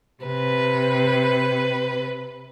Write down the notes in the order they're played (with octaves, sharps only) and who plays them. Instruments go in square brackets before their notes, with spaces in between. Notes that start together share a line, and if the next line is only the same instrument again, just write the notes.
[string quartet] C3 B4